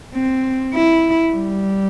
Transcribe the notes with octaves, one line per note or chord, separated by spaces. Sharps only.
C4
E4
G3